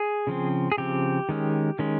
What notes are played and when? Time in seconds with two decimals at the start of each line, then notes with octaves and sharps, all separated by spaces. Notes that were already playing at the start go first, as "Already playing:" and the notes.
Already playing: G#4
0.27 C#3 F3 C4
0.72 G#4
0.78 C#3 F3 C4 G4
1.29 D#3 G#3 C#4
1.79 D#3 G#3 C#4